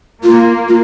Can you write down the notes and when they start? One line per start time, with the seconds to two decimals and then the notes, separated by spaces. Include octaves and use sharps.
0.24 A#3 F4
0.68 F4